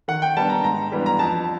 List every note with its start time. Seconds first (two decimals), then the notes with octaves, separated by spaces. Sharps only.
0.08 D#3 F#5
0.22 G5
0.37 G3 B3 D4 A5
0.50 A#5
0.64 G#2 A#5
0.92 E3 G3 B3 D4
1.06 A#5
1.19 F2 A5